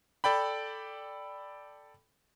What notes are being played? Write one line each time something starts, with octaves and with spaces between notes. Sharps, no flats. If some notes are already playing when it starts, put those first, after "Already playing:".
A4 D5 G5 B5